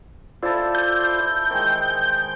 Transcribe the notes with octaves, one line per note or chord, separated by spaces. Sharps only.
E4 F4 A4 C5 D5
G6
D#3 G#3 C5 G5